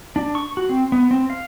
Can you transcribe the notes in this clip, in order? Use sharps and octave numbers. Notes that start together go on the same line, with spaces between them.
D4
C#6
F#4
C4
B3
C4
F5